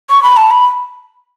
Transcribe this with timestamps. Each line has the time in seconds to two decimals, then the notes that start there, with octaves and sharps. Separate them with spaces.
0.10 C#6
0.23 B5
0.37 A5
0.51 B5